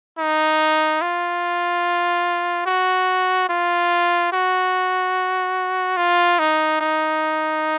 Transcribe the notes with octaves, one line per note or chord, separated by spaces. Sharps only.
D#4
F4
F#4
F4
F#4
F4
D#4
D#4